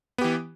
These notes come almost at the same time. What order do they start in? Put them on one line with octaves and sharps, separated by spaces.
B3 G4 E3